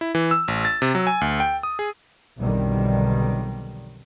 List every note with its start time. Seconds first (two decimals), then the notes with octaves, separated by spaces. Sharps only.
0.01 E4
0.15 E3
0.31 E6
0.48 A1
0.65 A6
0.82 C3
0.95 F#3
1.07 G#5
1.21 D2
1.40 G5
1.63 D#6
1.79 G#4
2.40 B1 F2 B2 D3 D#3 G3